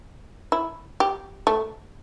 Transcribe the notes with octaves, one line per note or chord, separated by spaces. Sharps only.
E4
G4
A3